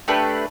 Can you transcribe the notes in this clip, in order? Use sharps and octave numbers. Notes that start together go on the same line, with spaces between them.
A3 D4 G4 B4